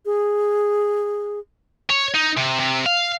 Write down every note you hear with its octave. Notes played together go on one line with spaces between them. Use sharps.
G#4
C#5
D#4
C3
C3
F5